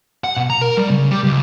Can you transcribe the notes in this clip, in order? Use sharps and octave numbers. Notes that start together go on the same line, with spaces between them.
F#5
B2
A#5
A#4
G3
C#3
G3
C#2